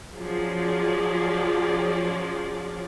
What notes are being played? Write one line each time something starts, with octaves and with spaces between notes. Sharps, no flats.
F3 F#3 C#4 G#4 D5